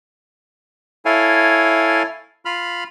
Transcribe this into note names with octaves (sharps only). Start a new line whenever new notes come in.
E4 A4 C#5 F5 G#5
F4 B5 F6